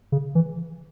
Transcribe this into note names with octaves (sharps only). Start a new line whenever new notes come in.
C#3
E3